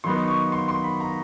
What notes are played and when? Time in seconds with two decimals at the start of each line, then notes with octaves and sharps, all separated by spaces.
0.04 D#3 F#3 B3 D#4 C6
0.28 C#6
0.52 C6
0.68 C6
0.84 B5
1.00 A#5